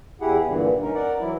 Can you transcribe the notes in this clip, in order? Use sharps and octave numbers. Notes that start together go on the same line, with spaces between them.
E2 E4 G4 G#4 F#5
G2 A#2 D3 E3
C#4 D#4 A#4
A#4 D5 F#5
E3 F#3 E4